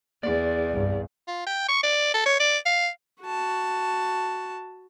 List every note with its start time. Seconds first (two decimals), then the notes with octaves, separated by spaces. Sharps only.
0.23 E2 D5
0.70 C2 G2
1.28 F4
1.47 G5
1.69 C#6
1.83 D5
2.14 A4
2.26 C#5
2.40 D5
2.66 F5
3.23 F#4 A5